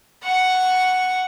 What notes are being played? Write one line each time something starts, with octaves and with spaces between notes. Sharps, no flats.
F#5 C#6